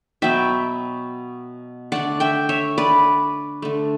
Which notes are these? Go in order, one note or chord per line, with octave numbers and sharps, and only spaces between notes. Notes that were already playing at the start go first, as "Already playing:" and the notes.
B2 F#3 B3 E5 G5
D3 A3 D5 F#5
E5 G5
C#5 E5
B4 D5
D3 A3